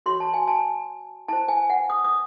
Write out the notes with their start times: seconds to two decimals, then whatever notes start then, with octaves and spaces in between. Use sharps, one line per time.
0.06 F#4 C#5 C6
0.20 A5
0.34 G#5
0.48 A5
1.28 E4 C5 A5
1.48 G#5
1.70 F#5
1.90 D#6
2.05 D#6